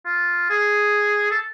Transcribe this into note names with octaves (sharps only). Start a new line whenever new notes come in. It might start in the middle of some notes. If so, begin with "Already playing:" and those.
F4
G#4
A4